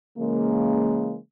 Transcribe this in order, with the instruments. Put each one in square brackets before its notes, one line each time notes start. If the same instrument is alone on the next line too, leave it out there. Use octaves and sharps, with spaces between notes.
[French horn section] C#3 E3 G#3 A#3